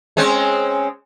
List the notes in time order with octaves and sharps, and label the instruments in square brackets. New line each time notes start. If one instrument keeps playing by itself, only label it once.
[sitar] G#3 C4 C#4